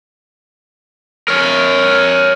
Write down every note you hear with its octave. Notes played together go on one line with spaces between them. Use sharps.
A#4 C#5